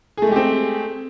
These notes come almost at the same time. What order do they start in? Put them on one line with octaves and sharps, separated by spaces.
G#4 A3 G#3 G4 C4